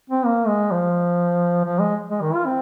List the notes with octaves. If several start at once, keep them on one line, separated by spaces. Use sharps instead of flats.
C4
A#3
G#3
F3
F3
G#3
G#3
D#3
F4
C4